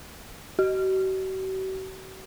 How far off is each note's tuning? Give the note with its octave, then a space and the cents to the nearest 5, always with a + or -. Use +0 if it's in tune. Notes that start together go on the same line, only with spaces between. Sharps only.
F#4 +45